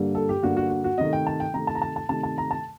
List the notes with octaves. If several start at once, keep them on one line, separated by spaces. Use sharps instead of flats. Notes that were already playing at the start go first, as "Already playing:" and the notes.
Already playing: G2 D3 G3 A#3
A4
G4
G2 D3 G3 A#3 F#4
F#4
F#4
F#4
C3 D#3 A3 D#5
G5
A5
G5
C3 D#3 A3 A#5
A5
A#5
A5
A5
C3 D#3 A3 A5
A5
A#5
A5